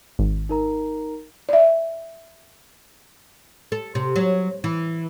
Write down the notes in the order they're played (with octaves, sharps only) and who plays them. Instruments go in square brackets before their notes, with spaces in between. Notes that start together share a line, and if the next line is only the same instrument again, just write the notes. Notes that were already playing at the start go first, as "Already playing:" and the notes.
[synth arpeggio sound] G#1
[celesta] D#4 A#4 A#5
[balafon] D5 E5
[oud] A4
C3
F#3
E3